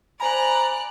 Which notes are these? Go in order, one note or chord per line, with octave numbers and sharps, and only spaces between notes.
C5 D5 G#5 A#5 B5 F#6